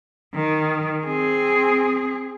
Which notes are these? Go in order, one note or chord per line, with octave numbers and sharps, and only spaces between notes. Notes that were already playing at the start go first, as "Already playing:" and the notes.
D#3
C4 G#4